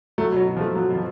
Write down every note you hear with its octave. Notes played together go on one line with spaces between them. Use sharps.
F#3 A3
B2 F#3
B2
F3
A3
F3 F#3
B2
F3